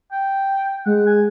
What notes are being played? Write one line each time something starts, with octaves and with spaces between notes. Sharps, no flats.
G5
G#3 F#5
G#5